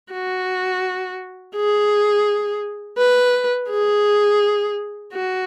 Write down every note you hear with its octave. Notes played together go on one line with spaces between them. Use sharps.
F#4
G#4
B4
G#4
F#4